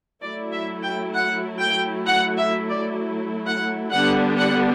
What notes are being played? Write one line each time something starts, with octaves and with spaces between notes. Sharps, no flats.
F#3 A3 E4 D5
E5
G5
F#5
G5
F#5
E5
D5
F#5
D3 G3 B3 D4 F#5
F#5